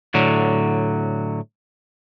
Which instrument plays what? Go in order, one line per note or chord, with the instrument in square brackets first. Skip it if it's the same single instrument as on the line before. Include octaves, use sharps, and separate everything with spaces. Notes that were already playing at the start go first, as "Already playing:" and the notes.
[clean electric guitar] A2 D3 F#3